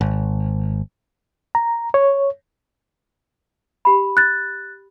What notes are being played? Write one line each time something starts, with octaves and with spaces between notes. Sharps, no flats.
G#1
A#5
C#5
G4 B5
F#6 A6